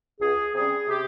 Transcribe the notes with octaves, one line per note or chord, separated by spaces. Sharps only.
C#2 G#4
C3 G3 C#4 G#4
C3 G4